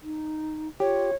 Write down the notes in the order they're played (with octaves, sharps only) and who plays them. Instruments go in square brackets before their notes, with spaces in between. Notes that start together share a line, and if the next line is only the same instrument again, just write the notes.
[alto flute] D#4
[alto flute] F4 [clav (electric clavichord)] G4 [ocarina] C#5